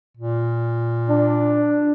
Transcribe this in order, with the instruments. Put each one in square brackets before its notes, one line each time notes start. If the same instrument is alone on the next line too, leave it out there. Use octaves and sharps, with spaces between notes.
[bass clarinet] A#2
[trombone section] D4